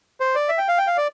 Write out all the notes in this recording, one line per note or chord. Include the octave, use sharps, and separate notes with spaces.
C5
D5
E5
G5
F5
G5
F5
D5